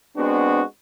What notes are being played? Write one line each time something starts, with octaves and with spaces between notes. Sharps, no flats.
G#3 B3 C4 D4 F#4